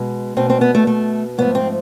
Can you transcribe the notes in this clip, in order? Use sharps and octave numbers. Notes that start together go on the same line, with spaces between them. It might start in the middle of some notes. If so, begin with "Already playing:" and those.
Already playing: B2 G#3
B2 A3 C4
C4
B3
A3
A3
G#2 F3 A3 B3
C4